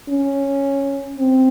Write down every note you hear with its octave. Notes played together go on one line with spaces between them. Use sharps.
C#4
C4